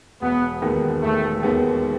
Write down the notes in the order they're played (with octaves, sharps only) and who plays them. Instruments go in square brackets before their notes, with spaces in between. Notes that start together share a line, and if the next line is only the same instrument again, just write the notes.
[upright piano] E1 [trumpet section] B3
[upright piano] D#2 D#3 G#3 B3
[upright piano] E1 [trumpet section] A3
[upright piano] D#2 D#3 G#3 B3